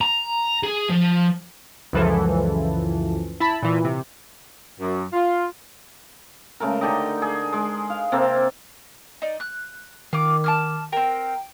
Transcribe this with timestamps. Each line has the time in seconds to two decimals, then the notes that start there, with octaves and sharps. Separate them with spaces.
0.01 A#5
0.63 G#4
0.89 F3
1.93 C#2 F#2 E3 F3 A4
3.40 E4 A5 B5
3.63 A#2 E3
3.85 C3
4.80 F#2
5.13 F4
6.60 C#3 G#3 A3 A#4
6.81 D3 D#4 G4 D#5
7.22 G#4
7.53 G#3
7.90 F5
8.12 C3 A#3 C4 A4
9.22 D#4 D5
9.40 F#6
10.13 D#3 F4 D6
10.44 A5 D6 F6
10.92 C4 A#4 G5